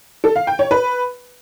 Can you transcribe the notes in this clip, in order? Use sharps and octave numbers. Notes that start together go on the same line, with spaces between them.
A4
F5
G5
C#5
B4